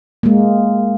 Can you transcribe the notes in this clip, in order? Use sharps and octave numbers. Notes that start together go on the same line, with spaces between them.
G#3 A#3